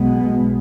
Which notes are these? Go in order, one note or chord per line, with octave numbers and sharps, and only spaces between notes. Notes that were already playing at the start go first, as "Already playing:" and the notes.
Already playing: B1 B2 G#3 B3